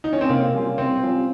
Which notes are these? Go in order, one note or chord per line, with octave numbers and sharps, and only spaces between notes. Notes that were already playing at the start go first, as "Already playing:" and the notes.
D#4
C#4
C4
C3 A#3
G3 C#4 F4
C3 C4
G3 C#4 F4